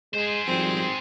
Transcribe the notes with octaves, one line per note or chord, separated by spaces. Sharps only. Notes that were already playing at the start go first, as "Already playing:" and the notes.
G#3 G#4 C5
G#1 F3 G3 C4